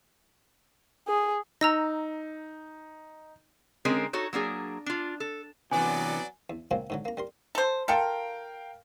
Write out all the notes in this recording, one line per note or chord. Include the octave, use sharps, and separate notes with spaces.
G#4
D#4 A#5 E6 A#6
D3 G#3 C4 C#4 G#4 A#4
D#4 F#4 A4 C#5
F#3 A#3 D4 G#4
D4 F4
A4
C3 E3 F#3 B3 D5 G#5
E2
C#3 F3 F#3 G#3 A#3 C4
G#2 D3 F#3
A#3 A#5
G3 A#4 C6
A4 C5
F4 A4 A#4 F5 G5